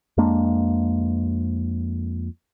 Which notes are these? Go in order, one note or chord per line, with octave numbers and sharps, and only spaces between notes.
F2 G#3 A#3 D4